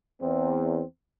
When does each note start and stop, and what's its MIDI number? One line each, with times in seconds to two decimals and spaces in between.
0.20 0.82 40
0.20 0.82 60